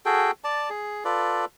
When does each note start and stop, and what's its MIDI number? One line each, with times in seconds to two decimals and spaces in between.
0.06 0.31 66
0.06 0.31 68
0.06 0.31 69
0.06 0.31 79
0.44 0.70 74
0.44 0.70 81
0.70 1.04 68
1.05 1.45 65
1.05 1.45 69
1.05 1.45 71
1.05 1.45 74